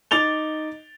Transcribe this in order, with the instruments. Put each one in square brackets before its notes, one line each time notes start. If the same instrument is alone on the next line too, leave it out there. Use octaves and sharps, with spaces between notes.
[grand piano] D#4 D6 A6 F7 G7